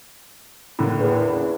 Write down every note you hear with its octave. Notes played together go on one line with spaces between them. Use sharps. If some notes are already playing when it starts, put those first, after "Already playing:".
A2 D3 A#3
E2
C#4